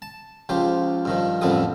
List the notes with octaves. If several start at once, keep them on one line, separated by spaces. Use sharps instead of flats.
A5
C#2 F3 G4 C5
G2 D#3 F3
A1 F2 D3 F3 G3 D#6